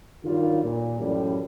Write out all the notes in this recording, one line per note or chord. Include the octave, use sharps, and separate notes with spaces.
G2 D#3 F#3 G3 F4
A#2
A1 F#2 A2 F3 G3